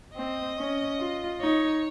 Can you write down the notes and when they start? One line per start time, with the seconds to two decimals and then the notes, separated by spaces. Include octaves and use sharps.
0.16 C4 D#5
0.57 C#4
0.99 F4
1.40 D#4 C#5